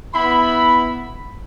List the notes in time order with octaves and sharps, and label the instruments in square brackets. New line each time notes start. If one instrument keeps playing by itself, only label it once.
[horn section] B3 E4 B5